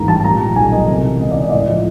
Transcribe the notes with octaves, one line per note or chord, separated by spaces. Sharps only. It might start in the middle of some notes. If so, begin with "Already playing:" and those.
Already playing: A1 G#2 E3 A#3 A#5
G3 A5
A#2 A#5
G3
B1 G#5
A#3 D#5
C3
E3
C#2 D#5
D5
C#2
D#5
A2 D5
D#5
F3